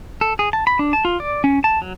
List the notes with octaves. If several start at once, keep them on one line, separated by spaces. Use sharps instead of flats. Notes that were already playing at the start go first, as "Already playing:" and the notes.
A4
G#4
A5
B5
D4
A5
F4
D5
C#4
A5
F#3